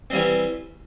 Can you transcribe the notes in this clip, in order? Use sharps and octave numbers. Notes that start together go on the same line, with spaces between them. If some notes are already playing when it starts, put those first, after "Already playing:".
E3 G3 C4